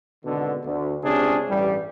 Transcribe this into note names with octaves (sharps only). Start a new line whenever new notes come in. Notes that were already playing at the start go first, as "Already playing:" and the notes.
G#1 B2 D3
D2
C#2 C3 C#4 D4 G#4
A1 G2 G3